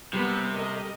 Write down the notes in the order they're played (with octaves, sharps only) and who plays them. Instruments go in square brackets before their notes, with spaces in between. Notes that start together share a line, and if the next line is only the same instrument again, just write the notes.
[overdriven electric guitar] C3 [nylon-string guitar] G3 A#3 [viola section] B3 B4
[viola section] A4 A#4 D#5